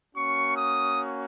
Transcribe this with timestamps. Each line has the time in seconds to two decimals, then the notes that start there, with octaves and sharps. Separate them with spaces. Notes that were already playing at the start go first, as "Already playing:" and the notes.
0.15 A#3 C#4 F#4 C#6
0.57 D#6